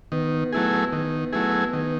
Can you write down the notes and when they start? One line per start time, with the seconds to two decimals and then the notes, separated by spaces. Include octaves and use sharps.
0.12 D#3 B3
0.53 F#3 A3 E4 G#4
0.92 D#3
1.33 F#3 A3 E4 G#4
1.73 D#3